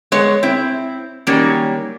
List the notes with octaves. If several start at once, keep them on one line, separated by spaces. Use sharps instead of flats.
G#3 B3 C#5
C4 E4
D#3 F#3 G3 A#3 C#4